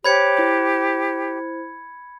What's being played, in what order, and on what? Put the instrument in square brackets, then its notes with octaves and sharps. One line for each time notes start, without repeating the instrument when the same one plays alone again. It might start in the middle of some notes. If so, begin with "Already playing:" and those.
[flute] G4 [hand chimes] C5 C#5 [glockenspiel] B5 G#6 C#7
[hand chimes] E4 C5